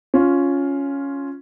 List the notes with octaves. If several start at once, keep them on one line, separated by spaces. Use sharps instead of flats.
C#4 F4